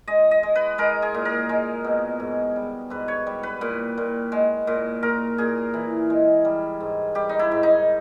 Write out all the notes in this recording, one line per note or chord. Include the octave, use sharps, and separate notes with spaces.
G#3 D#5
D#5
G#3
B4
G#3 A#4
G#4
A#2
A#4
G#3
B2
G#2
G3
G#2 B4
C#5
G3
B4
A#2
A#2
G#3
A#2
A#2 A#4
A#2 G#4
E3
G#3
G3
G#2
G3 G4
D#4
E4
G#2
D#4